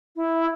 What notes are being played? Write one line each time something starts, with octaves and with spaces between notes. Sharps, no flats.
E4